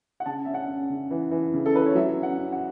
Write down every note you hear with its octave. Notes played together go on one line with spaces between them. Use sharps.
F#5
C#3 A5
C#4 E5
F#5
C#4
C#3
E3
E3
C#3
A4
E3 B4
C#5
F#3 E5
C#4
F#5
C#4
F#5